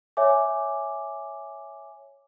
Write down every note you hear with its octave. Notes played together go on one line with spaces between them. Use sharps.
C#5 E5 G#5 D6